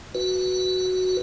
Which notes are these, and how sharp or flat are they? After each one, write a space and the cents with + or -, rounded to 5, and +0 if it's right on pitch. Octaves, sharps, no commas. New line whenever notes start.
F#4 +0 B4 +0